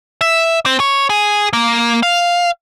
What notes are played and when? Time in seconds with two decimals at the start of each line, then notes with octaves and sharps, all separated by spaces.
0.21 E5
0.66 C4
0.80 C#5
1.10 G#4
1.53 A#3
2.03 F5